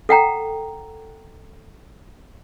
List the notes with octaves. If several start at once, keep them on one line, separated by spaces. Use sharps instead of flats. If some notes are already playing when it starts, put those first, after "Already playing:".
A4 F#5 G5 A#5